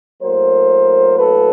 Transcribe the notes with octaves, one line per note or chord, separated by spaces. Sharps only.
A2 F#3 A#3 A#4 C5
A4 B4